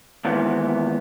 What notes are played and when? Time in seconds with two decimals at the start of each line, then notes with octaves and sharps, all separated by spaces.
0.25 D#2 G#2 E3 B3